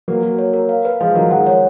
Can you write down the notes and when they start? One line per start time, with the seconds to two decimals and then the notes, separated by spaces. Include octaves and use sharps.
0.08 F#3 A#3 B4
0.23 F#4
0.39 C#5
0.54 A#4
0.69 F5
0.85 B4
1.01 F3 G#3 F5
1.15 D#3 F#3 A#4
1.31 F3 G#3 F#5
1.47 C#5